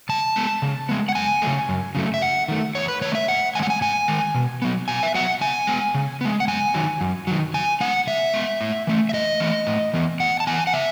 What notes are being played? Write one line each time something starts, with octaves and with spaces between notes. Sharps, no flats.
C#3 A5
G#3 B3
C#3
G#3 B3
F#5
F#2 G#5
C#3 F#3 A3
F#2
C#3 F#3 A3
E5
E2 F#5
D#3 A3
E2 C#5
B4
D#3 A3 C#5
E5
G#2 F#5
D#3 G#3 G#5
F#5
G#5
G#2 G#5
D#3 G#3
B2
F#3 B3
B2 G#5
E5
F#3 B3 F#5
C#3 G#5
G#3 B3
C#3
G#3 B3
F#5
F#2 G#5
D#3 F#3
F#2
D#3 F#3
C#3 G#5
G#3 B3 F#5
C#3 E5
G#3 B3
A2
E3 A3
E5
A2 D#5
E3 A3
A2
E3 B3
A2 F#5
A5
E3 B3 G#5
F#5
C#3 E5